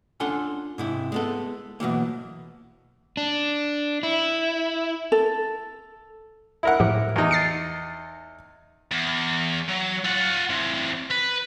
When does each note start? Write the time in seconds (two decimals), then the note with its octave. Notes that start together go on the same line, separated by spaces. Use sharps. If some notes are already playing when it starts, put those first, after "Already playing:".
0.20 C#4 D4 F4 A4 F#5 C6
0.78 G#2 C3 E4
1.12 G#3 B3 A4
1.80 B2 E3 F#3 A#3
3.17 D4
4.03 E4
5.12 A4
6.63 E4 A#4 F#5
6.80 A2 F3 G4
7.16 E2 D#4
7.31 A6 C7 C#7
8.92 E2
9.69 F#3
10.04 F4 F#5
10.50 E3 C4
11.10 B4